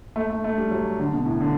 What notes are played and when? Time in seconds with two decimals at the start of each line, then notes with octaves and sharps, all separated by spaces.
0.16 A3
0.30 A3
0.44 A3
0.58 G3
0.71 F#3
1.00 D3
1.13 B2
1.26 A2
1.40 D3